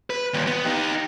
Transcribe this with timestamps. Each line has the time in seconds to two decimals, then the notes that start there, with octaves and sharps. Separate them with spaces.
0.10 B4
0.34 D#2 A#2
0.47 B3
0.65 D#4 G4